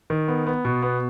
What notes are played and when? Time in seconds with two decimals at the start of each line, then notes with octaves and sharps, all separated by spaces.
0.10 D#3
0.28 B3
0.47 B3
0.65 B2
0.83 B3